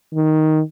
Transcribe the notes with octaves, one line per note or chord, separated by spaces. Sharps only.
D#3